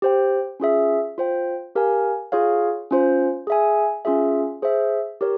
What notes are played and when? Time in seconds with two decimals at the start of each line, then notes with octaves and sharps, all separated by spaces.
0.02 G4 C5 G5
0.60 C#4 F4 G#4 E5
1.18 F4 C5 G5
1.75 G4 A#4 F5 G#5
2.32 F4 G#4 C#5 F5
2.91 C#4 F4 C5
3.47 G#4 E5 G#5
4.05 C#4 F4 G#4 E5
4.62 G#4 C5 E5
5.21 G4 A#4 C#5